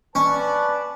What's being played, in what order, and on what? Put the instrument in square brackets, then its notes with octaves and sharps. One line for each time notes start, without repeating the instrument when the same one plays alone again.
[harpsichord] C#4 [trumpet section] B4 D5 A5